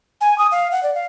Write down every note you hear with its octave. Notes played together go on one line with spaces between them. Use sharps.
G#5
D#6
F5
F#5
D5
F5